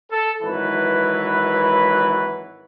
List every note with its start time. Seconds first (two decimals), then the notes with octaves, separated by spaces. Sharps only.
0.11 A4
0.43 G#1 E3 F#3 B4